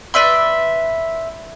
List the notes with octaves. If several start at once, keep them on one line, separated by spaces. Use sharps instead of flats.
B4 D5 E5 C6